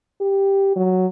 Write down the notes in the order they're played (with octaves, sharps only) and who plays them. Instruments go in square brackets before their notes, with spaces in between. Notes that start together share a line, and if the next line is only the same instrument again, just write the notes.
[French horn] G4
F#3